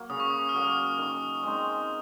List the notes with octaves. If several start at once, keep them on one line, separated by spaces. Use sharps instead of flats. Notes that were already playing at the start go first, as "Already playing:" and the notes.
Already playing: F#3 A#3
C#3 D#6
C#6
D#6
F6
F#3 A#3 D#6
D#3
G#3 C4 D#4